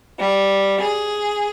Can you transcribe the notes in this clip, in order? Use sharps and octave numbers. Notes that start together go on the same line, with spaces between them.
G3
G#4